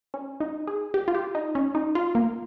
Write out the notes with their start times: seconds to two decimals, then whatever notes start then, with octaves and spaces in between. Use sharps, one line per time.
0.14 C#4
0.40 D#4
0.67 G#4
0.94 G4
1.08 F4
1.15 G4
1.35 D#4
1.55 C#4
1.75 D#4
1.95 F4
2.15 A#3